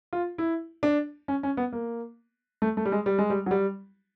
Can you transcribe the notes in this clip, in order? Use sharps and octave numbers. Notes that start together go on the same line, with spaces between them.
F4
E4
D4
C#4
C#4
B3
A#3
A3
A3
G3
G#3
G3
G#3
G3
F#3
G3